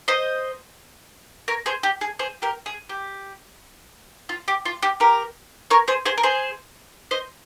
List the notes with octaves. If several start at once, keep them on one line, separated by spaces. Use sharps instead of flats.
C5 D#5
A#4 C#5
G#4 C5
G4
G#4
G#4 C5
G4 A#4
G#4
G4
F4
G4
F4
G4
G4 A#4
A#4 C#5
G#4 C5
G#4 C5
A#4
G#4 C5
C5 D#5